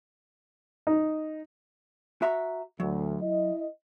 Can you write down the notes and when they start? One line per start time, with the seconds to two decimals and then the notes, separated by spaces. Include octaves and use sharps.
0.87 D#4
2.22 F#4 E5 A#5
2.80 D2 F#3
3.22 E4 D#5